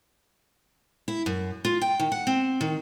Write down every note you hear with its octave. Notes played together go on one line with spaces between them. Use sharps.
E4
F#2
F4
G5
D#3
F#5
C4
D#3